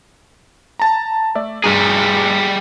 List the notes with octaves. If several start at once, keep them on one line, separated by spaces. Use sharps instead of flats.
A5 A#5
A3 D5 E5
G2 G3 G#4 A#5